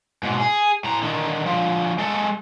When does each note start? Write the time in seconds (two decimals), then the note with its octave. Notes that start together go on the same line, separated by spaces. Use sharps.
0.23 G#2 B2
0.40 G#4
0.84 A2 A#5
1.03 D3 D#3
1.46 D3 F3
1.98 G#3 A4